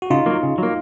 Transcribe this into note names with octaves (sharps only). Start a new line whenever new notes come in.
F#4
C#3 D#4 F4
F#3 A#3
C#3
F#3 A#3